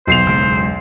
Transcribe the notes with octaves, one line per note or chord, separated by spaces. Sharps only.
B1 E2 C5 C7 F7
F#1 G#3